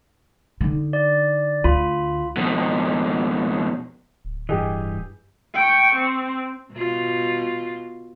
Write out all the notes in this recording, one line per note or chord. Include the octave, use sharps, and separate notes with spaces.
D3 D#4
D5
D2 F4 B5
F2 B2
D1
G2 E3 G4 G#4 D#5
G5 C#6
C4
B2 F4